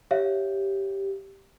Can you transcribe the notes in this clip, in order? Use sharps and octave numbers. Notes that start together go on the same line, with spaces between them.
G4 C#5 E5 F5